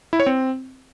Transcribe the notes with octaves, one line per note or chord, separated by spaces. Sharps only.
E4
C#5
C4